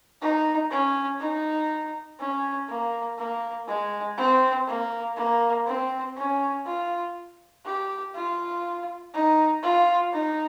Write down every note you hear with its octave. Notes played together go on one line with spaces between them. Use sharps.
D#4
C#4
D#4
C#4
A#3
A#3
G#3
C4
A#3
A#3
C4
C#4
F4
G4
F4
D#4
F4
D#4